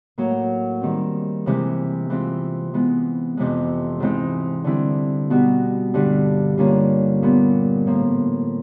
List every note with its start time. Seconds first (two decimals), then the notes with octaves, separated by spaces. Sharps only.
0.18 A2 F#3 A#3
0.81 D#3 G3 C4
1.46 C3 E3 G#3
2.10 E3 G#3 C4 F4
2.74 E3 G#3 B3
3.37 F2 C3 E3 G#3
4.00 G#2 E3 G#3 C4 D#4
4.64 D3 G3 C4 E4
5.30 B2 G3 B3 D#4 F#4
5.94 G2 D3 G3
6.58 D3 G3 A#3 C#4 F4
7.22 A#2 G3 B3
7.86 A2 F3 A#3